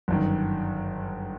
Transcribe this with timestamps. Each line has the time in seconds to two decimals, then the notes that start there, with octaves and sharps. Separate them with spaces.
0.08 G1 F#2 D#3